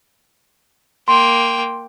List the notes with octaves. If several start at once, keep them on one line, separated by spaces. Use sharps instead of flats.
A#3 G5 C6